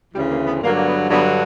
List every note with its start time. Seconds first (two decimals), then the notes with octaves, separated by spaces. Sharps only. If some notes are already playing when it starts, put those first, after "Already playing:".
0.14 D2 C#3 E3 G3
0.31 A#3
0.46 B3
0.62 G2 D3 F#3 A#3
0.75 A#3
0.85 B3
1.10 G2 D3 F#3 B3